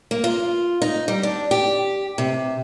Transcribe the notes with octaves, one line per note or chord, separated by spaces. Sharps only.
A#3
F4
D#4
G3
D4
G4
C3